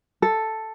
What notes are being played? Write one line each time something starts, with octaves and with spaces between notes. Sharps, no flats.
A4